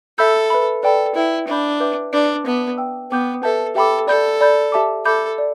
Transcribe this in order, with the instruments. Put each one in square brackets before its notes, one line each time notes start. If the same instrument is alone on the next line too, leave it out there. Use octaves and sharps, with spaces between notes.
[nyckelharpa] A4 [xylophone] E5 B5 E6 G6
[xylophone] B4 E5 B5
[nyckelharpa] A4 [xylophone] B4 D5 G5 B5
[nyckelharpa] E4 [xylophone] B4 E5 G5
[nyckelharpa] D4 [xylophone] E5 B5 G6
[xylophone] B4 E5 G5 D6 G6
[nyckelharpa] D4 [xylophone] B4 D5 B5 D6 G6
[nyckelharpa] B3 [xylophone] B4 E5 A5 D6
[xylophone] E5 G5 E6
[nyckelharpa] B3 [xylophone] B4 G5 D6 G6
[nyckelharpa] A4 [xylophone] B4 E5 A5 G6
[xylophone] G4 E5 G5 B5 D6 [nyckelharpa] A4
[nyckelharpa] A4 [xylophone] D5 B5 G6
[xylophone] D5 B5 G6
G4 E5 A5 D6
[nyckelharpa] A4 [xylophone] E5 B5 D6 G6
[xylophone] D5